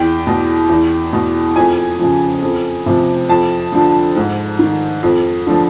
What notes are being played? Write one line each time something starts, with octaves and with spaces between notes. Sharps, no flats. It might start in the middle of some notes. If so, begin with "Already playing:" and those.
Already playing: E2 G5
B2
E2
B2
F2 G#5
C#3 F3
F2
C3 F3
F2 A5
D3 F3
G#2
D#3
F2
D3 F3